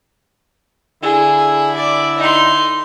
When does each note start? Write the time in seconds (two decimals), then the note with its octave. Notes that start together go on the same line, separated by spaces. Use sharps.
1.02 D3 E4 G#4
1.76 D5
2.19 D#4 C6